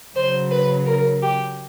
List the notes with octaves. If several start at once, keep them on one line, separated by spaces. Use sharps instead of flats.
C#3 F#3 C5
B4
A#4
G4